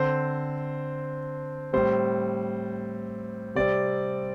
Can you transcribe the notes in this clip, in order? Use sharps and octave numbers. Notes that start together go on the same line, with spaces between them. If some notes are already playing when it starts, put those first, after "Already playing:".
Already playing: D3 C4 C5
A2 G3 C4 C5
C3 G3 C4 D5